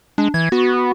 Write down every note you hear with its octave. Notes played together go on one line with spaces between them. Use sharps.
G#3 D4
E3 G#6
B3 F#4